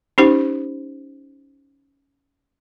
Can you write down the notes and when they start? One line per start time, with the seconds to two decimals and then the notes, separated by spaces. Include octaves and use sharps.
0.18 C#4 D#4 G4 C5